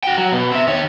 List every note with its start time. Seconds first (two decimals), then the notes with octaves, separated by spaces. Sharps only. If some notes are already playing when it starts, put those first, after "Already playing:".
0.03 F#4 G5
0.18 F#3
0.32 B2
0.51 C4 E5
0.67 D#3 C#5